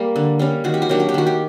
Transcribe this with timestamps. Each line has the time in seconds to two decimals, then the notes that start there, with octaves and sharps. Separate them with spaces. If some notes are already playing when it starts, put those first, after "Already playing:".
Already playing: G3 A#3
0.16 D3
0.39 G3 A#3 C#4
0.64 D#3 F#4
0.74 G4
0.82 F#4
0.89 F#3 A#3 D4 G4
1.00 F#4
1.09 G4
1.14 D#3 F#4
1.27 G4